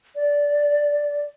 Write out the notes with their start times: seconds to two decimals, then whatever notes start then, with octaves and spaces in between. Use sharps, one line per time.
0.16 D5